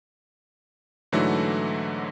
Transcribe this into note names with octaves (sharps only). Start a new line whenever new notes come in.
G#2 D3 E3 F#3 A3 E4